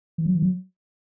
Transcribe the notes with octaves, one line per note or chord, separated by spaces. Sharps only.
E3
F#3
E3
F#3